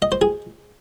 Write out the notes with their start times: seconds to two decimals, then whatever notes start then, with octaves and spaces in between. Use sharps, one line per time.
0.02 D#5
0.12 C5
0.21 G#4